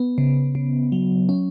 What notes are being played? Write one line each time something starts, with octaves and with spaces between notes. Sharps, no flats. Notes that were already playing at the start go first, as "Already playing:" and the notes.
Already playing: B3
C#3
C#3
F#3
C#4